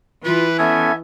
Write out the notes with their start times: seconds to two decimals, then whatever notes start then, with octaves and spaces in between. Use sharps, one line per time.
0.25 E3 F4 B4
0.59 B3 C#4 A4 E5 G#5